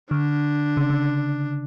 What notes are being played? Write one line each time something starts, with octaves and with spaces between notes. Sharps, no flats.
D3 D4
C#3
C#3